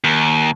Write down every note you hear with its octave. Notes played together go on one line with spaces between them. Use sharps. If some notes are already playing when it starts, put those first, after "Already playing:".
D#2